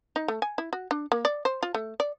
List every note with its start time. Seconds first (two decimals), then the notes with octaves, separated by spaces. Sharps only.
0.16 D#4
0.28 A3
0.42 G#5
0.58 E4
0.73 F#4
0.91 D4
1.12 A#3
1.25 D5
1.45 C5
1.63 F4
1.75 A3
2.00 D5